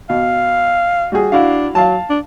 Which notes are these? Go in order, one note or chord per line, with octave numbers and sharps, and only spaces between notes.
B2 F5
G3 F#4 G#4
D4 E4 F#4 F5
F#3 F5 A5
D4